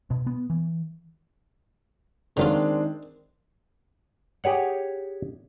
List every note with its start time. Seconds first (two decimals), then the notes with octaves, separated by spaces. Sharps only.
0.10 B2
0.27 B3
0.50 E3
2.37 D3 D#3 F#3 G#3 C4 D4 F4
4.44 G4 G#4 C#5 F#5